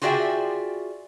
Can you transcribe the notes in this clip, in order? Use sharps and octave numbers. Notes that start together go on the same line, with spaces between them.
F4 F#4 G#4 D5 E5 G5